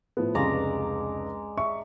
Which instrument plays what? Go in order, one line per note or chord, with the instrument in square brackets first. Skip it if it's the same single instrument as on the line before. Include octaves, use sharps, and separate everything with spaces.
[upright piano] A2 F3 B3
[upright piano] F1 C#2 [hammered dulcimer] G#3 D5 A#5
[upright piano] E5 C#6